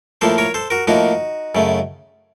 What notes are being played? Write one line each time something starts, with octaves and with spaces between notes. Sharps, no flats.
A2 F3 A#3 A4 C5
A#4 C#5
A4 C5
F#4 A#4
A2 F3 A#3 D#4 F#4
F#2 C#3 A3